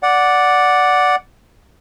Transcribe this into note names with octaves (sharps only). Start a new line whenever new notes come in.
D5 F#5